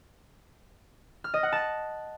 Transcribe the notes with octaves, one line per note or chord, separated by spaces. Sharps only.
F6
D#5
F#5
A5